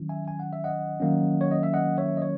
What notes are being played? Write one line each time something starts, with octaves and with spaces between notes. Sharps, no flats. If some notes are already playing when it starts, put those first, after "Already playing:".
Already playing: D#3 F#3 C#4 E4
E5 G#5
G#5
F#5
E5
D#5 F#5
D#3 F#3 A#3 C#4
C#5
D#5
E5
D#5 F#5
C#5 E5
D#5
C#5